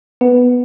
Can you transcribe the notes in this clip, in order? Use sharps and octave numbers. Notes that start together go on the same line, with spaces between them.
B3